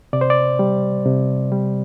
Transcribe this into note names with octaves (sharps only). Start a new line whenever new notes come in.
C3 D5
C5
D5
G3
C3
G3